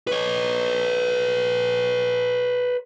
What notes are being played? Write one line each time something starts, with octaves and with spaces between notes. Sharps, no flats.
B4 C#5